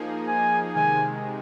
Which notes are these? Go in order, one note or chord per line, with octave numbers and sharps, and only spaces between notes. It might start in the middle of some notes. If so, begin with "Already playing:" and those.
Already playing: F3 A#3 D#4 G#4
G#5
C3 D#3 G#3 G#5